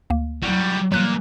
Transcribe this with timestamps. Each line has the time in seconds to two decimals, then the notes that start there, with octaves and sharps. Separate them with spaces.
0.10 D2 A#3
0.43 F#3 G3 E4 F#4
0.92 A#2 E3 F#3 G3 F#6